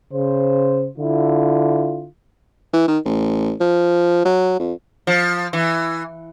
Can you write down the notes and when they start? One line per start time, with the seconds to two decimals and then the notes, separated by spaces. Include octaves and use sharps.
0.12 C#3 C5
0.98 D3 E4 F4
2.73 E3
2.88 D#3
3.05 A1
3.60 F3
4.25 F#3
4.60 F2
5.07 F3
5.53 E3